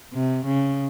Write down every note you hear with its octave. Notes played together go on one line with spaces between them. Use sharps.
C3
C#3